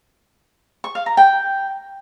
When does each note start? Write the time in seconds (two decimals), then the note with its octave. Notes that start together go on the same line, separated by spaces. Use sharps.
0.84 C#6
0.95 F5
1.06 A#5
1.17 G5